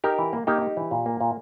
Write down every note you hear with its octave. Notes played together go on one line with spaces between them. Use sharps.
D#4 G4 A#4
E3
A#3
A#3 D#4 G4
D#4
E3
A#2
A#3
A#2